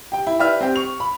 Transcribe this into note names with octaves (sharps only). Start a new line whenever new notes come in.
G4 G5
E4
G4 B4 D5 E5 F6
C4 G4
C#6 F7
B5